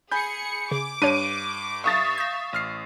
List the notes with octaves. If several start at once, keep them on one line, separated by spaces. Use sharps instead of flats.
G#4 G#5 B5 G6 C#7
C#3 D6
G2 D4 C#5 D#7
E5 F5 C#6 D#6 A6
G6 A#6
A1 F6 C7